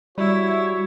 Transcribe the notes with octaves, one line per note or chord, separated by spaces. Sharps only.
G3 E4 F#4 C#5